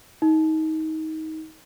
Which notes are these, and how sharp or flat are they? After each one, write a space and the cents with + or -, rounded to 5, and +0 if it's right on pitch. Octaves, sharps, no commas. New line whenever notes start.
D#4 +25